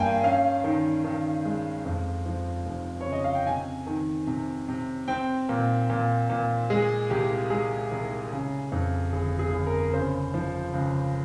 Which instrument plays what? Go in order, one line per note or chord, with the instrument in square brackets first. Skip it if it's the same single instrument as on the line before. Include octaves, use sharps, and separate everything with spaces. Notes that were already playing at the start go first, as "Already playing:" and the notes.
Already playing: [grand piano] G2 A#3 G5 G#5
C#4 F5
D#3
D#3
G#3
F2
F3
F1
C#5
C#3
D#5
F5
G5
C3 G#5
D#3
C3
C3
C4 G5
A#2
A#2
A#2
G#3 G#4
C2 G4
G#3 G#4
C2
C#3
F2
G1 G#4
G#4
G1
A#4
C#3 C5
F3
C#2